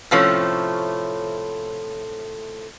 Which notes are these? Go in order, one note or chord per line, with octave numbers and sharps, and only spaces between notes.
A2 C3 F3 A3 C#4 C#5